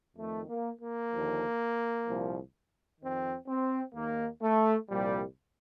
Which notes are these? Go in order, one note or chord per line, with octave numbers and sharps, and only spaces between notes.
F2 D#3 A3
A#3
A#3
D#2 D3 F3
C2 A#2 F3
F2 D#3 C4
C4
D#2 D#3 A#3
A3
C2 A#2 F3 G3